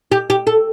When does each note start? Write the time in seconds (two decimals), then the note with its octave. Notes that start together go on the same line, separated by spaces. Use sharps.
0.12 G4
0.30 G4
0.47 A4